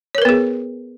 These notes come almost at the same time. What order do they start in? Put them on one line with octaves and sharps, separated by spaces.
C#5 A#4 B4 B3 G#4